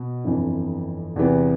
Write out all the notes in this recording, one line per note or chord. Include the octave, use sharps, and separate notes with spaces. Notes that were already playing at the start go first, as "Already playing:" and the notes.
Already playing: B2
G1 F2 E3
E2 C3 E3 B3